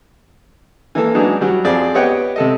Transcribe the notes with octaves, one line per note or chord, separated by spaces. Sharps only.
E3 A#3 A4
E3 F#3 G#3 D4 D#4
F#3 G3
F2 C4 G#4 D5
B3 G4 C#5 D#5 F#5 G5
C3 A4 D#5